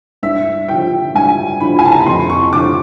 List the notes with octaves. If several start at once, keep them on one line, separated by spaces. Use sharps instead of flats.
G2 E5
D3 F3 G5
G2 G#5
D3 F3 B5
G#5
A5
A#5
B5
F2 C6
C#6
D3 F3 D6